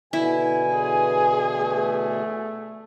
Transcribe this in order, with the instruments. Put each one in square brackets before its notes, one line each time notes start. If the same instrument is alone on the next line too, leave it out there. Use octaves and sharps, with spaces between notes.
[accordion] B2 D3 E3 [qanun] E4 [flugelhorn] G#5
[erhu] G#4
[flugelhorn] A3